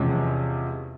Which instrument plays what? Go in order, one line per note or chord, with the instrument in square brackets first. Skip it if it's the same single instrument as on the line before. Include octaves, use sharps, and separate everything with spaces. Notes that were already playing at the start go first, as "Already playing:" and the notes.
Already playing: [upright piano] E2 C3 F3 G#3 C#4